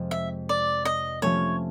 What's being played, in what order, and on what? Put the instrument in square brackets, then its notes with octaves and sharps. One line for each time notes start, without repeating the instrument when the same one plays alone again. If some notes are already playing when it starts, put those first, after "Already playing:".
Already playing: [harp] F2 C3 F3 G#3
[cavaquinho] E5
D5
D#5
[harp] C3 F3 A3 C#4 [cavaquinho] C#5